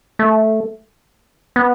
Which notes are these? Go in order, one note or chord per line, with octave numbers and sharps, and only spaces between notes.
A3
B3